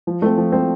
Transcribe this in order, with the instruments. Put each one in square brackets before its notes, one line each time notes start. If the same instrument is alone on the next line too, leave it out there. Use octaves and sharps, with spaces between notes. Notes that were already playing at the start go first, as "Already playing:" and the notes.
[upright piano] F3
A3 C4
F3
A3 C4